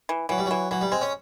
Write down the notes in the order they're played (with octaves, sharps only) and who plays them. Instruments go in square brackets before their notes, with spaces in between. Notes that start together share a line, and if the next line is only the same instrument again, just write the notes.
[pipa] E3
[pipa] E3 [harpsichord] F#3
[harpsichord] G3
F#3
[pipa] E3
[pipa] E3 [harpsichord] F#3
[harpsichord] G3
[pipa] G#3 [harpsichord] C4
[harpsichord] C#4